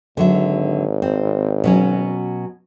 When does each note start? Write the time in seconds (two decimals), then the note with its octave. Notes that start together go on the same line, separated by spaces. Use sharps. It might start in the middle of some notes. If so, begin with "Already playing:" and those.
0.17 G#1 D3 F#3 E5
1.02 C4
1.64 B2 F#3 C#4